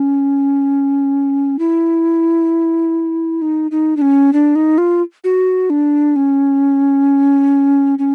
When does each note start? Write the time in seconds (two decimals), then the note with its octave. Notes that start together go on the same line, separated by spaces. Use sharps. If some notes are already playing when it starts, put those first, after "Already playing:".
Already playing: C#4
1.59 E4
3.42 D#4
3.71 D#4
3.97 D4
4.02 C#4
4.33 D4
4.55 D#4
4.78 F4
5.24 F#4
5.70 D4
6.16 C#4
7.99 C#4